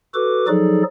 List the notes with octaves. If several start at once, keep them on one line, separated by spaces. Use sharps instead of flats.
F#4 A4 B4 D6
F3 F#3 D#4 G#4 A4 D5